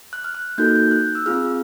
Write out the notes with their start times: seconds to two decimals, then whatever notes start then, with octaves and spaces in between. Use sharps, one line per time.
0.13 F#6
0.24 F6
0.35 F#6
0.58 A#3 D#4 F#4 A4 G6
0.76 G6
0.91 F#6
1.15 E6
1.26 C4 F4 G#4 F6